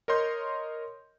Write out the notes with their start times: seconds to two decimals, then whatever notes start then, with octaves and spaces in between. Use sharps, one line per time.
0.08 A#4 C#5 D#5 C6 G6